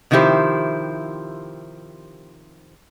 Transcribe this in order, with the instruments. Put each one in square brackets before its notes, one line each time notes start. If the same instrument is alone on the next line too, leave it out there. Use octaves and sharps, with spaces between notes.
[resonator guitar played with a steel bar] C3 D#3 F3 E4 G4 C5